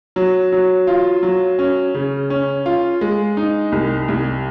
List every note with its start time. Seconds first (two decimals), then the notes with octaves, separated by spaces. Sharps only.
0.16 F#3
0.52 F#3
0.87 F4
1.23 F#3
1.59 C#4
1.94 C#3
2.30 C#4
2.66 F4
3.01 G#3
3.37 D#4
3.72 C2
4.08 C2